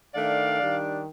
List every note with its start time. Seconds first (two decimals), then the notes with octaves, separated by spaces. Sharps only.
0.14 D#3 A3 D4 D5 F5
0.59 D#3 G3 D4